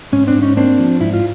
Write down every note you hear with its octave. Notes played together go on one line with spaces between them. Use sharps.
G#2 C#4
C4 D4
G#2
C#4 D#4
A#3 C4 D4
F3
G#2 E4
F4